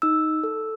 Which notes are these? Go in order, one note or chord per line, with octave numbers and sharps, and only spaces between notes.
D#4 E6
A4